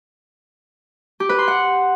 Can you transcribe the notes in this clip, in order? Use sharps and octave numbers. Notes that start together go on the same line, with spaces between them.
G4
B4
C6
F#5